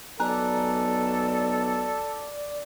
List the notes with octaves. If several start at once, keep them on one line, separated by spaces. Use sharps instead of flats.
B1 A4 D5 G#5 A#5 F#6